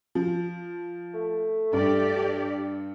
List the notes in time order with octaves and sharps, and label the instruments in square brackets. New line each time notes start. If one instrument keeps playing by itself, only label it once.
[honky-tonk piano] F3
[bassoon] A3
[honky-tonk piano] G2 [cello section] G4 D5